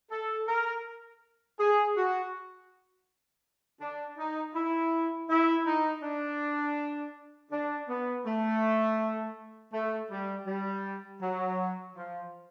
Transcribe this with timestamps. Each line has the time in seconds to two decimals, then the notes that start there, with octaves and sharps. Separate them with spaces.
0.10 A4
0.48 A#4
1.59 G#4
1.97 F#4
3.81 D4
4.18 D#4
4.55 E4
5.30 E4
5.66 D#4
6.02 D4
7.52 D4
7.89 B3
8.26 A3
9.73 A3
10.11 G3
10.46 G3
11.21 F#3
11.96 F3